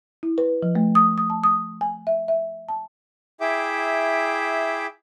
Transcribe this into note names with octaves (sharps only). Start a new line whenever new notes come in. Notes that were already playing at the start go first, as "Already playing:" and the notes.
E4
B4
F3
A3
D#6
D#6
A5
D#6
G#5
E5
E5
A5
E4 G#4 E5 G5 D6